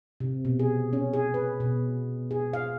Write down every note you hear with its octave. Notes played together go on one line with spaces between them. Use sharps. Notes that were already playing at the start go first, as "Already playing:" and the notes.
C3
B2
G#4
C#4
G#4
B4
B2
G#4
F5